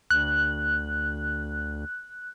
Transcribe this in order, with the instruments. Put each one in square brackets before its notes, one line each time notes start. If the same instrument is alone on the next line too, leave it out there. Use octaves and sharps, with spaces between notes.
[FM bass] D2 [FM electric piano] F#6